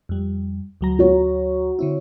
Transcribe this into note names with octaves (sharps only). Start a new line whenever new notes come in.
F2 G3
D2 F#3 A#5
F#4 C#5
D3 C4 E4